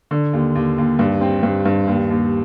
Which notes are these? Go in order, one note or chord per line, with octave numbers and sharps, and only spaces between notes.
D3
D#2
D#2
D#2
G2
C4
G2
G2
D#2
D#2